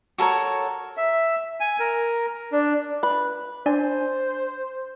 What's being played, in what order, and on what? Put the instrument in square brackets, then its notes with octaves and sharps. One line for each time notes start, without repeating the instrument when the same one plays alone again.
[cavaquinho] F#4 A4 A#4 C#5
[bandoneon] E5
G#5
A#4
D4
[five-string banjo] B4
[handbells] D4 D5 G#5 [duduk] C5